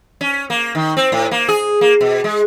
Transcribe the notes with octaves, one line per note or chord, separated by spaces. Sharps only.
C#4
A#3
D#3
C4
A2
A#3
G#4
A#3
B2
G#3